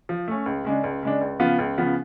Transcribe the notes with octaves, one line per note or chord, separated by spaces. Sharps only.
F3
A3 C#4
C#2
C#3 G#3 D4
C#2
C#3 G#3 D4
C#2
C#3 F3 B3 F4
C#2
C#3 F3 B3 F4